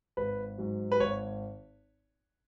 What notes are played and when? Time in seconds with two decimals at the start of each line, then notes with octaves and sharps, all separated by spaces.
0.17 G#1 B4
0.58 G#2 F#3
0.92 B4
1.00 G#1 C#5